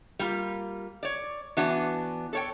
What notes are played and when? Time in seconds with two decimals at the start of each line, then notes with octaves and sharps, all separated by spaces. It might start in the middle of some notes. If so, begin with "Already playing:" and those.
0.19 G3 A#3 F4
1.03 C#5 D5
1.57 E3 B3 D4 F#4
2.33 A4 C#5 G5